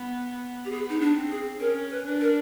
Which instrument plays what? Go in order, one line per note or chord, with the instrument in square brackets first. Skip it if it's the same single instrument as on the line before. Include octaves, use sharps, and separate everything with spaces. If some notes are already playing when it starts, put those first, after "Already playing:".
Already playing: [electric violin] B3
[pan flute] G4
[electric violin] B3 [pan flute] G#4
[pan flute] D#4
D4
[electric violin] C4
[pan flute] G#4
[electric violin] C#4 [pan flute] A#4
[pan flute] B4
[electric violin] D4
[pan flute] A#4